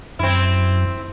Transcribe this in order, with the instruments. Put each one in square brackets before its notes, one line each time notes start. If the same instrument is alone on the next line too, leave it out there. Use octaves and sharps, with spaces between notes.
[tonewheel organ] F#2 [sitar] C4 E4